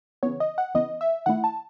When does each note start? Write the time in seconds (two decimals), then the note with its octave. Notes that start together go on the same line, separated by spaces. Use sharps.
0.23 C#3 E3 B3 C#5
0.40 D#5
0.58 F#5
0.75 C#3 E3 B3 D#5
1.01 E5
1.26 D#3 A3 E4 F#5
1.44 A5